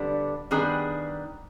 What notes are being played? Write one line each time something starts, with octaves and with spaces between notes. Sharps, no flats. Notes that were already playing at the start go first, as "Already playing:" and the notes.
Already playing: D3 G3 B3 D4
D#3 G3 B3 D4 G#4